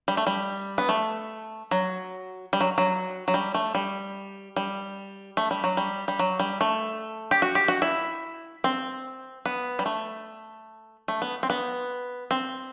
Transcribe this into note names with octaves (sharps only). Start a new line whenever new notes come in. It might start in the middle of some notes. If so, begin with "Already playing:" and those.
G3
A3
G3
B3
A3
F#3
G3
F#3
F#3
F#3
G3
A3
G3
G3
A3
G3
F#3
G3
G3
F#3
G3
A3
G4
F#4
G4
F#4
E4
C4
B3
G3
A3
A3
B3
C4
B3
C4